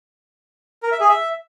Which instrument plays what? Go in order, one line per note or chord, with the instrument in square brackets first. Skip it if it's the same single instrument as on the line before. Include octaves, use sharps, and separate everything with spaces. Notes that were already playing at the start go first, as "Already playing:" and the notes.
[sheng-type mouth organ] A#4
E5
G#4
E5